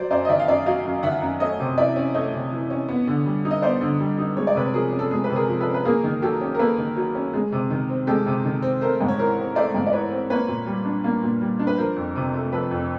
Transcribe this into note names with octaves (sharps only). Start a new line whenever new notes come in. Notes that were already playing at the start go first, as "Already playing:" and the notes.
Already playing: F#3 C5 D5
F#2 C5 D5
D#5
D#3 D5 E5
F5
F#2 D5 E5
F#3 D#5 F5
F#2
D#3 E5 F#5
F#2
A3 C#5 D#5
C3
E3 D5 E5
C#4
A3 C#5 D#5
C3
E3
C#4
B3
D3
G3
D#4
D#5
B3 C5 D5
D3
G3
D#4
G#3 C#5
D5
C3 B4 C#5
F3 G#4 A#4
C#4
A4
G#3 G#4
B4
C3
G#4 A#4
F3
A4 B4
C#4
B4
A#3 G#4 A#4
D#3
F#3 G4 A4
C#4
A#4
A#3 A4 B4
D#3
F#3
C#4
G#3
C3
D#3
C4
G#3 G4 A4
C3
D#3
C4
A3 A#4 C5
G#2
C#5
E3 A#4 C5
C4
A3 C5 D5
G#2
D5
E3 B4 C#5
C4
A#3 B4 C#5
A#2
G3
D4
A#3
A#2
G3
D4
B4
F3 A#4 C5
F2
C3
A3
F3 A4 B4
F2